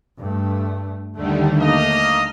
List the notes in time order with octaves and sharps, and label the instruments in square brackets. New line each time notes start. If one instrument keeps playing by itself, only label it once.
[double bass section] G2 A3
[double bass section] D#2 A3 [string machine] D3 D#3 G3
[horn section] A#3 D#5 [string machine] F6